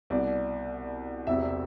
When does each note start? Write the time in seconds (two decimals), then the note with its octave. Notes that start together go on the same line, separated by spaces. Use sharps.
0.10 C2 B2 D5
1.27 E1 E2 C3 E5